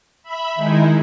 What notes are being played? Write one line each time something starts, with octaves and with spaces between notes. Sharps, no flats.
E5 B5
D#3 G#3 D#4 E4